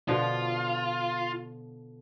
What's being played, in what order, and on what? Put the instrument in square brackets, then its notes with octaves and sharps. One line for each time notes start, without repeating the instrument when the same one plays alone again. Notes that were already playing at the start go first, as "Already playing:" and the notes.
[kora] B2 D3 F3 [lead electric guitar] F4